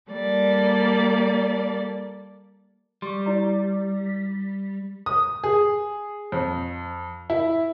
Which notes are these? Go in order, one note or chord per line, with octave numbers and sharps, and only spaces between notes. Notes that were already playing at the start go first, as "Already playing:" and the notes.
G3 A#3 A4 D5
G3 C6 C#6
E4 D5 A#5
D#6
G#4
F2
E4